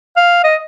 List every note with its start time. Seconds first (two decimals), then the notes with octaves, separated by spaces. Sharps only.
0.17 F5
0.44 D#5